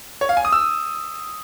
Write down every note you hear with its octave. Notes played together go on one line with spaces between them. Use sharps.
C#5
F5
G#5
D#6
E6